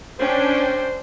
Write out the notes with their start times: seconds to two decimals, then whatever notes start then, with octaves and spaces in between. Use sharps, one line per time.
0.20 C#4 D4 C5 G5